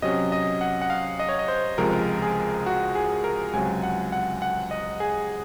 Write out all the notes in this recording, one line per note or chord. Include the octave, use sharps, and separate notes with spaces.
C3 F#3 C#4 D#5
D#5
F#5
F#5
F5
D#5
C#5
D#5
C5
C#2 C3 F3 G#3 A#4
G#4
F#4
G#4
A#4
C#2 C3 F#3 G#5
F#5
F#5
F#5
D#5
G#4